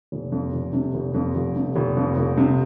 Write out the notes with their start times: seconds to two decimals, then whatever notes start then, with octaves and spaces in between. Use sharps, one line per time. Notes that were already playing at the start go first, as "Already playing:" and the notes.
0.12 F1
0.32 F2
0.52 F1
0.73 C3
0.94 F1
1.14 F2
1.35 F1
1.56 C3
1.76 F1
1.97 F2
2.17 F1
2.38 C3